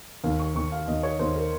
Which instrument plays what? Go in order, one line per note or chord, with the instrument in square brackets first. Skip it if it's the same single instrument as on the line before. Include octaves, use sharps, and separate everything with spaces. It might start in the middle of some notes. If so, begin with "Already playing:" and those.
[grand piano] D#2 [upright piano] F5
[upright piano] C#6
[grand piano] D#2 [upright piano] C#6
[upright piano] F5
[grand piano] D#2 [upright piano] D#5
[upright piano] C#5
[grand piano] D#2 [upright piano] C5
[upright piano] A#4